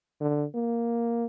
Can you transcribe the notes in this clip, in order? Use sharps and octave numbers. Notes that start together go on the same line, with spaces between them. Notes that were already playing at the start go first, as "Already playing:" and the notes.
D3
A#3